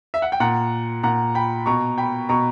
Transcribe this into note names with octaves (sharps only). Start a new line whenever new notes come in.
E5
F#5
G5
A#2 F#5 A#5
A#2 F#5 A#5
G5 B5
B2 A#5 C#6
G5 B5
B2 A#5 C#6